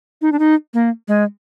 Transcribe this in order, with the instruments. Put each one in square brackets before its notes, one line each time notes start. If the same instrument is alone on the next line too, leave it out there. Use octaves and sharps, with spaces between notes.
[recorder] D#4
D4
D#4
A#3
G#3